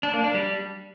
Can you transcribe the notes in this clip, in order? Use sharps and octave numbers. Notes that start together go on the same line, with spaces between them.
D4
A#3
D4
G3